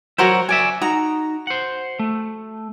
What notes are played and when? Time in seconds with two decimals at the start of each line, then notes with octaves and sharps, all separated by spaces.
0.18 F#3 F#4 A#4 C5 C#5 E5
0.49 F#4 D5 E5 G#5
0.81 D#4 F#4 A#5
1.47 C5 F#5
1.99 A3